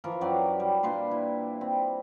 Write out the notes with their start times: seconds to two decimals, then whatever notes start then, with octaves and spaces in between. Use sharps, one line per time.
0.04 E3 F3 F4 A#4
0.21 F#2 F#3 G4 D5
0.60 G3
0.83 A#2 D4 B4 C6
1.11 E4
1.61 C4